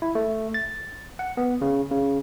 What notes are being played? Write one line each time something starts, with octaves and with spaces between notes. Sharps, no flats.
E4
A3
A6
F#5
B3
C#3
C#3